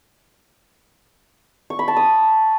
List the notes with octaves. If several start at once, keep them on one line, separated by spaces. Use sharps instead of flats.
C#6
B5
A5
D#6